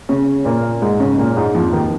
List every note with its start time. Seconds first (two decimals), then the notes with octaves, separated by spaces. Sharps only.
0.09 C#3 C#4
0.45 A#2 A#3
0.82 G#2 G#3
1.00 C#3 C#4
1.18 A#2 A#3
1.37 G#2 G#3
1.54 F2 F3
1.73 D#2 D#3